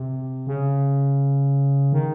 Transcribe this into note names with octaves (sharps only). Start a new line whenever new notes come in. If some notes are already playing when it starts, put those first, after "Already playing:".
Already playing: C3
C#3
D#3